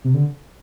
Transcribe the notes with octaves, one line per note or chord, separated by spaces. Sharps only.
C3
D3